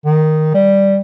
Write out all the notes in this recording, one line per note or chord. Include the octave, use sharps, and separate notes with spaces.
D#3
G3